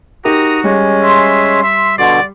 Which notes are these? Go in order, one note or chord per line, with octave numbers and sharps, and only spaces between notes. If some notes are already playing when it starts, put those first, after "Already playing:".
D#4 F#4 G4 A#4 A#5 D#6
G3 G#3 C#4
E5 C6
E5
B2 D3 D5